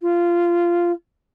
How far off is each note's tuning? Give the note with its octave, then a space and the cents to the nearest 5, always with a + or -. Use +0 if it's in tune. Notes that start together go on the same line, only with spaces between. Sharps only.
F4 -15